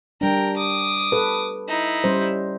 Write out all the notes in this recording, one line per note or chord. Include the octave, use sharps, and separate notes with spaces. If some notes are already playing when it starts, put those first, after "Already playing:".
G3 D4 A#4 G5
D6 D#6
A4 B4
D#4 E4
G3 C#4 C5